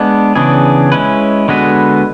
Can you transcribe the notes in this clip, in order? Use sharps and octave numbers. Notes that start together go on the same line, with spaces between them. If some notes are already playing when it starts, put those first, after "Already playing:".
Already playing: G#3 B3 D4
C#3 E3 B3 D4 G#4
G#3 C#4 E4 B4
D3 G#3 B3 F#4 B4